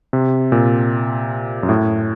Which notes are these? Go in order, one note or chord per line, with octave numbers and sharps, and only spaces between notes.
C3
A#2
F#2
A2